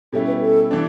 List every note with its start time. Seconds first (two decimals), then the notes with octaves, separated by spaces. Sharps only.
0.13 B2 G3 C#4 E4 A4
0.27 B4
0.42 A4
0.71 E3 B3 D4